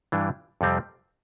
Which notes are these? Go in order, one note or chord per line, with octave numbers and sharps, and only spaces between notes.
G2 E3 G3 D4
F2 C3 G3 C4